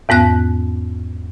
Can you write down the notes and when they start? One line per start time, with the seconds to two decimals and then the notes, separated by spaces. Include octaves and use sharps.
0.09 E2 G#2 B3 F#6